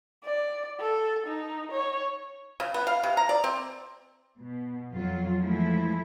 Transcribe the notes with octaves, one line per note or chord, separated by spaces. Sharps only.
D5
A4
D#4
C#5
C#3
B3
F5
C3
A#5
D5
C4
B2
F2 F#3 F4
E3 F3 G#3 A3 E4